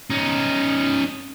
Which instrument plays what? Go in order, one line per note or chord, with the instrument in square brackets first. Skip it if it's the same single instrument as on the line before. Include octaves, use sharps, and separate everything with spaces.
[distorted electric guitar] C#4 D#4